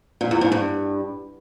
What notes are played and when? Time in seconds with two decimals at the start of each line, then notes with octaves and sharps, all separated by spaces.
0.21 A#2
0.31 E2
0.41 G#2
0.52 G2